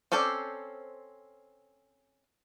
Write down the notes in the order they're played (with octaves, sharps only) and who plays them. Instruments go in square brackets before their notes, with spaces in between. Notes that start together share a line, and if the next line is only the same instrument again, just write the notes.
[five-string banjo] C4 C#4 A4 C5 D5